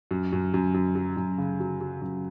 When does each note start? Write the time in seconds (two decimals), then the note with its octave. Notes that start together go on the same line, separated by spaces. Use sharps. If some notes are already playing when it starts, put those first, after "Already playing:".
0.11 F#2
0.32 F#2
0.54 F#2
0.74 F#2
0.95 F#3
1.17 F#2
1.38 C#3
1.60 F#3
1.81 F#3
2.02 F#2